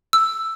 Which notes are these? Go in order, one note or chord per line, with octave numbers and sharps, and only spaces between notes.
E6